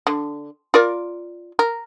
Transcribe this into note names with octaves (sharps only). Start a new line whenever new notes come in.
D3
F4 A#4 D5
A#4